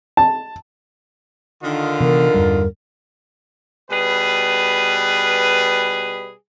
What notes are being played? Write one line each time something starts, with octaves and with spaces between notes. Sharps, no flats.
A5
D3 D#3 F4
C3 E3 B3 A#4
E2 G2 G3
B2 G3 G#4 B4